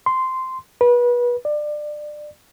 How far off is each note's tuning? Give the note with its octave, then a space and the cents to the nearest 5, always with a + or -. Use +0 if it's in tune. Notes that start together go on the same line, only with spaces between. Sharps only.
C6 -10
B4 -30
D5 +25